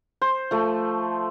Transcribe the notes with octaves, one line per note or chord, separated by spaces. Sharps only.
C5
F3 A3